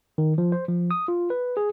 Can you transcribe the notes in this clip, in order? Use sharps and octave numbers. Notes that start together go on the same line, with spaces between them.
D#3
F3
C5
F3
D#6
F4
B4
G#4